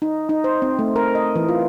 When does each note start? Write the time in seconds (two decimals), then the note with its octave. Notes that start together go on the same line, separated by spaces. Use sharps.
0.02 D#4
0.29 D#4
0.44 C5
0.62 C4
0.79 A3
0.96 A#4
1.15 D#5
1.36 E3
1.49 F4